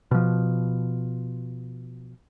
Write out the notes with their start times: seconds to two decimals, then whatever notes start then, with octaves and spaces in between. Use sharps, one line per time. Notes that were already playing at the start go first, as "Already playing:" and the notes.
0.11 B2 F3